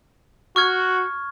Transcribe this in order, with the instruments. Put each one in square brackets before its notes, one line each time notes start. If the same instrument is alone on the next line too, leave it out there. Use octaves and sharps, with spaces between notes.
[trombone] F#4 [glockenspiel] C#6 F6 G#6